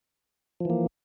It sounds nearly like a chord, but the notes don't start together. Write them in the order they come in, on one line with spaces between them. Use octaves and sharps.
F3 E3 A#3